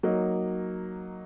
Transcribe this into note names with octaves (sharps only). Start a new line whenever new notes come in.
F#3 A#3 D#4